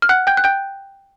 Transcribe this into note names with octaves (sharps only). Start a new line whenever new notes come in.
F6
F#5 F#6
G5 G6
F#6
G5 G6